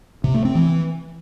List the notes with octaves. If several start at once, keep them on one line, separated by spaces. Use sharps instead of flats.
C3
A3
C4
E3